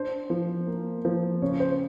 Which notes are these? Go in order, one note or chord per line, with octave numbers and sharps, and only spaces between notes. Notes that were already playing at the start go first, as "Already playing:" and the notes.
Already playing: D4 C5
F3
A#3
F3
C#3 C#5
C5